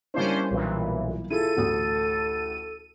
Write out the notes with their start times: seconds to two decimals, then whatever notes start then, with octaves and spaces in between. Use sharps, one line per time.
0.14 G3 A#3 C#4 D4 E4 C5
0.51 B1 A#2 E3
1.30 E4 F4 G#4 A4 D#7
1.57 A1 D2 D#6